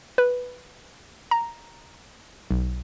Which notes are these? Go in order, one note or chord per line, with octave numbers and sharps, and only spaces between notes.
B4
A#5
B1